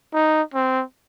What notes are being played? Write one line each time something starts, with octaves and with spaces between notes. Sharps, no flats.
D#4
C4